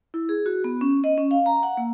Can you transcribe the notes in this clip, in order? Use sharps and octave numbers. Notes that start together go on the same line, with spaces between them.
E4
G#4
F#4
B3
C#4
D#5
C#4
F5
A#5
F#5
A#3